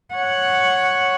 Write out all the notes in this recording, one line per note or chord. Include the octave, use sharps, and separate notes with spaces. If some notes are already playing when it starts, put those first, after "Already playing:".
C#5 F#5